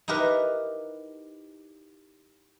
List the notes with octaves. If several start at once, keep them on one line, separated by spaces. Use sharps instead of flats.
D#4 E4 G4 A#4 B4